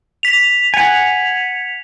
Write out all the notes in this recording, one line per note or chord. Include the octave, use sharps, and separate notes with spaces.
B6 F7
F#5 G#5